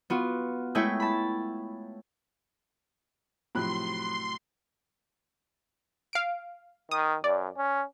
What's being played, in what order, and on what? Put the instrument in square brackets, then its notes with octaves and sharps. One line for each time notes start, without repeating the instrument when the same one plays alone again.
[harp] B3 F4 F#4
G#3 A3 E4 C#5 G5
A5 B5
[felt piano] A2 C3 F#3 [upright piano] F3 B5 F#6 [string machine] C6
[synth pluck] F5 D7
[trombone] D#3 [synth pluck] D#6
[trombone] F#2 [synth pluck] D5
[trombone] C#4